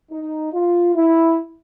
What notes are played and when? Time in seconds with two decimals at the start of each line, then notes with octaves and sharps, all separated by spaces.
0.11 D#4
0.53 F4
0.96 E4